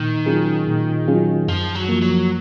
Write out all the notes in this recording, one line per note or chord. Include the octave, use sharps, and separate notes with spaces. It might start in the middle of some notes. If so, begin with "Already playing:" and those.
Already playing: A#2 D#3
F#3 C#4 F4 G#4
A#2
F#3 C#4 F4 G#4
F#2 F3
F#3
F3 A#3
F#3